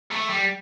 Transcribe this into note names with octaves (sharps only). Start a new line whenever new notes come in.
A3
G3